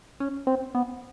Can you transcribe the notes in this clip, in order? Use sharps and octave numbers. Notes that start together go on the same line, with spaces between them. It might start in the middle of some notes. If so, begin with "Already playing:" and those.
C#4
C4
B3